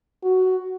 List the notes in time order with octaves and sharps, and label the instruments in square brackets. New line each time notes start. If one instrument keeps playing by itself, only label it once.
[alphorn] F#4